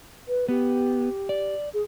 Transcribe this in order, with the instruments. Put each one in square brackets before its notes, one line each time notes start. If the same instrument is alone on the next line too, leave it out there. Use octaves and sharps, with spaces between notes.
[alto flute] B4
[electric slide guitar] B3 [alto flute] G4
[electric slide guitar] D5
[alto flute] G#4